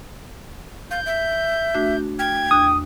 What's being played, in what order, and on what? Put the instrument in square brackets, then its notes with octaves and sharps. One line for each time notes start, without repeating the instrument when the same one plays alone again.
[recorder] F5 [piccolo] G6
[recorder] E5
[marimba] A3 D4 F#4
[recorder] G5 [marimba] F6 [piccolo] G#6
[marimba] E2 D4 F#6 [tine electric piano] D#6